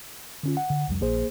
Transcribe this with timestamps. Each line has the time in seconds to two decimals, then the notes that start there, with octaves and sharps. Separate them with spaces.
0.43 D3 C#4 F4
0.57 F#5
0.70 D3
0.87 C2 F2 G3
1.01 A#1 A#3 G#4 C5